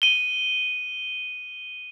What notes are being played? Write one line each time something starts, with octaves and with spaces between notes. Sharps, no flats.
D#7 G7